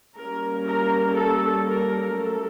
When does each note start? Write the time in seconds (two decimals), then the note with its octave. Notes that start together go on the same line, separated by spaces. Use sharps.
0.16 G3 A#3 C#4 A#4
0.67 A#4
1.17 A4
1.67 A#4
2.16 F#3 A3 A4